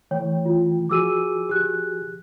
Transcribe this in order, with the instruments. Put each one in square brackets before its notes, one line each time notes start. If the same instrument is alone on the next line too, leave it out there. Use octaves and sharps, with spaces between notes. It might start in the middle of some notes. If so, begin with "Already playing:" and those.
[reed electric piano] E3 A3 G5 [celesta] C#5
[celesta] F4
[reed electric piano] F3 F#4 G#4 [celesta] D6 E6 D#7
[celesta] G4 F#6